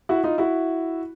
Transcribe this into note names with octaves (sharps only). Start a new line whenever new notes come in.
E4 F#4
D#4 F4
E4 F#4